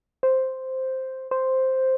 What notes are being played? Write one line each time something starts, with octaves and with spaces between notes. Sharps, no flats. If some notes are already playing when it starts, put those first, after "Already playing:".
C5
C5